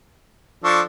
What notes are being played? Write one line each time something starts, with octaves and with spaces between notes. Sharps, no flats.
F3 D4 A4 C#6